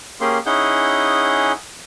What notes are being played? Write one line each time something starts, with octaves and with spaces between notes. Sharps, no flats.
A#3 C#4 G4 G#4 C6
C#4 D#4 E4 G#4 F#5 G6